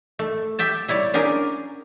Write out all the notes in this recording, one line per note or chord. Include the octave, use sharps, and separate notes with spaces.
A3
G4 E5 G5 A5
G3 E4 C#5 D5
C#4 D4 G4 G#4 A#4